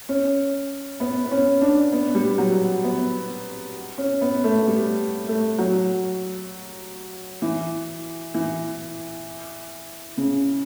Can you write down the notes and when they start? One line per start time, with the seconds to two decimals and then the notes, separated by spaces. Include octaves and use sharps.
0.09 C#4
1.00 B3
1.25 B3
1.31 C#4
1.61 D4
1.92 B3
2.15 G3
2.38 F#3
2.84 B3
3.98 C#4
4.21 B3
4.44 A3
4.67 G3
5.28 A3
5.58 F#3
7.42 E3
8.34 E3
10.17 C#3